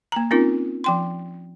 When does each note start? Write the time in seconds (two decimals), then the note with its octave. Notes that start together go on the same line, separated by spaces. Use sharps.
0.12 A#3 A#5
0.31 C4 C#4 D#4 F4 A#4
0.84 F3 G5 C6